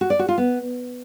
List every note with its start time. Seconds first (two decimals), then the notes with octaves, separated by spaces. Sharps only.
0.01 F#4
0.10 D5
0.19 F#4
0.28 F4
0.38 B3